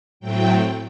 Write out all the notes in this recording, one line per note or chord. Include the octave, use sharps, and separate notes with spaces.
A2 F#3 A3 C4 G5